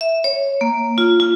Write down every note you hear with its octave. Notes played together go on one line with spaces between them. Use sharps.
E5
C#5
A#3
F4
F4